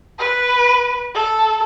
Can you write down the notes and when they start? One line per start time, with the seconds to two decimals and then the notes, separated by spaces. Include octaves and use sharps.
0.19 B4
1.15 A4